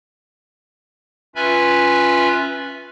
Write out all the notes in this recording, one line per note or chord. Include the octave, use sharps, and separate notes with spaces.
C#4 F4 B4 E5 G#5 B5